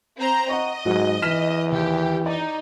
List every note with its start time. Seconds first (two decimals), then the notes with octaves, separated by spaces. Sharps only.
0.17 C4 C5 A#5
0.49 D#5 F#5 A#5 C#6
0.85 G#2 F#3 F#4
1.22 E3 F6 B6 E7
1.72 D#2 G4
2.26 D#4 D5